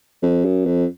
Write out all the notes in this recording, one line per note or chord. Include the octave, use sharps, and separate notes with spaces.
F2
F#2
F2